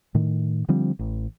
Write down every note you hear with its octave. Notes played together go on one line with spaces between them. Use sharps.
A2 D#3
D3 F3 G3 C4
A1